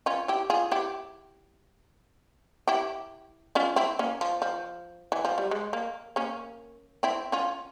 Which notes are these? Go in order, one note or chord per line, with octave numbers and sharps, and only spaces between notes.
C#4 F4
E4 G4
F4 G#4
E4 G4
E4 G4
C#4 F4
C4 E4
A#3 C#4
F3
F3
E3
F3
G3
G#3
A#3
A#3 C#4
C4 E4
C#4 F4